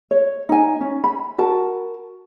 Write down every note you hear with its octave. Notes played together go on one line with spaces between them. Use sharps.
C#5
D#4 G#5
C#4
B5
F#4 A#4 A5